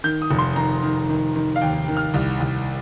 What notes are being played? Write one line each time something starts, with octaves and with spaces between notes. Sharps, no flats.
D#3 G6
D#6
F1
C6
D#3 A#5
D#3
D#3
D#3
F5
D#2 G5
D#3
F6
C2
C2